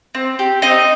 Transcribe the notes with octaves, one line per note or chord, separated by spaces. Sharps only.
C4
G4
C4 D#4 D#5